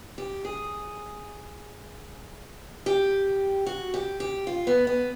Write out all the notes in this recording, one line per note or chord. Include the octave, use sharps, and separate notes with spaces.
G4
G#4
G4
F#4
G4
G4
F4
B3
B3